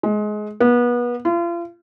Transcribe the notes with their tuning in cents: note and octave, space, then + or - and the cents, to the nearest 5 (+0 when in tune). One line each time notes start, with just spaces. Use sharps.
G#3 +20
B3 -30
F4 -35